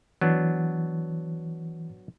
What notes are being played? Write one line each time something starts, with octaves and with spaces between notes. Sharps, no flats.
E3 F#3 B3 D4